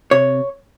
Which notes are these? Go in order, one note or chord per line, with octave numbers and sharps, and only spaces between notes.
C3 C#5